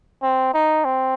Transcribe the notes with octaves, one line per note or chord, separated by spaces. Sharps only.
C4
D#4
C4